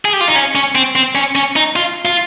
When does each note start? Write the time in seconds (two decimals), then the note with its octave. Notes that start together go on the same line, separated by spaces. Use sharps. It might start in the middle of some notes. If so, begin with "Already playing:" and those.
0.05 G#4
0.13 G4
0.21 F4
0.28 D#4
0.36 C#4
0.55 C#4
0.75 C4
0.95 C4
1.15 C#4
1.35 C#4
1.56 D#4
1.76 F4
2.05 F4